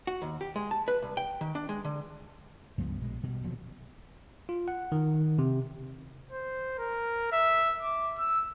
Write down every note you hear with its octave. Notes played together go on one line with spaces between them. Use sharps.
F#4
D#2
G4
G#3
A5
B4
C2
G5
D#3
D4
G#3
D3
C#2 G2 F3 B3
A#1 B2 G#3
B2 G3
D#1 B2 F3 F#3
F4
F#5
D#3
C3
C5
A#4
E5
D6
E6